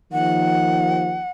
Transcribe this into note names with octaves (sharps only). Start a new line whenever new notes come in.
D#2 D#3 F3 F#5